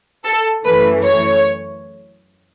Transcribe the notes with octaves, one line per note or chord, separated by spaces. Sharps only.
A4
F#2 E3 A3 B4
C#5